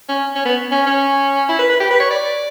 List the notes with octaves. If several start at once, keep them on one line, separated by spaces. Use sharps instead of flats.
C#4
C#4
B3
C#4
C#4
E4
B4
B4
G4
B4
C#5
D5